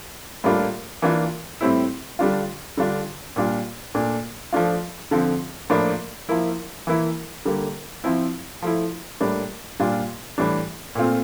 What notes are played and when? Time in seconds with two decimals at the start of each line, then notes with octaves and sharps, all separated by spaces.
0.44 A2 G3 A#3 D4 F4
1.02 E3 A#3 D4 F4
1.61 A2 G3 C4 E4
2.19 D3 G3 D4 F4
2.77 D3 G3 D4 F4
3.36 A#2 G3 D4 F4
3.95 A#2 A3 D4
4.53 F3 A3 D4 F4
5.11 D3 F3 C4
5.70 A2 F3 A#3 D4 F4
6.29 F3 A#3 E4
6.87 E3 A#3 E4
7.45 D3 G3 A#3
8.04 F3 C4 E4
8.62 F3 A3 E4
9.20 A2 G3 A#3 D4
9.80 A#2 G3 D4 F4
10.38 A2 E3 G3 D4
10.95 A#2 A3 C4 F4